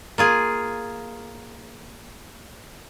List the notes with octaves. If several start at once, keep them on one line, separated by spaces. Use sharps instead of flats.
A#3 F4 G#4